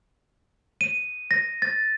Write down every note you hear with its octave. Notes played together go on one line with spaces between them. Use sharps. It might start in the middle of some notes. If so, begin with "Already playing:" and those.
D#7
A#6
A6